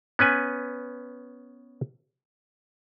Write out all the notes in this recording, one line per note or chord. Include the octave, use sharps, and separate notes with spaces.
B3 C#4 B4 G#5